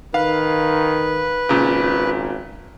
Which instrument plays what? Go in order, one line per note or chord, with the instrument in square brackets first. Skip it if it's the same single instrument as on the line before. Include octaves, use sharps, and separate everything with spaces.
[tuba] D#3 [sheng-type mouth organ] B4 [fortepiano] F5
[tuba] G#1 [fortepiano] A#2 C#3